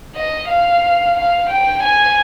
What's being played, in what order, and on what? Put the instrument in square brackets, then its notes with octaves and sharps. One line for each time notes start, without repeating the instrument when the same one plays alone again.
[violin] D#5
F5
F5
G5
G#5